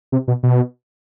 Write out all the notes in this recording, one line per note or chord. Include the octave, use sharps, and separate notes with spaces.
C3
B2
B2